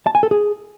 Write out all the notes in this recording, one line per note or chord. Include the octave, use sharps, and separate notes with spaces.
A5
G#5
A4
G#4